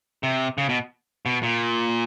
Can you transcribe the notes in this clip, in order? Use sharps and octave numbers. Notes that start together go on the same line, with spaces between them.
C3
C#3
B2
B2
A#2